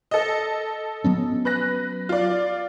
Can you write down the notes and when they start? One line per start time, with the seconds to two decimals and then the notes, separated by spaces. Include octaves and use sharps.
0.11 A4 D#5
1.04 F#3 B3 C#4
1.45 B4 F#6 A#6
2.09 F4 D5